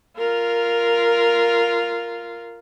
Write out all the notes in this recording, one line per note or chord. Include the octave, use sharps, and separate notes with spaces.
F4 A#4